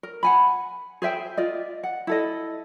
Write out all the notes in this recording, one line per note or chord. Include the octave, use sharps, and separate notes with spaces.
A#4
F#5 G#5 B5
G#4 C5 E5 G5
F4 D5 D#5
F#5
E4 A4 D#5